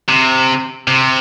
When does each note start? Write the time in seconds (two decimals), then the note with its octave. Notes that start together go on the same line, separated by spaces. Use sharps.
0.09 C3
0.88 C3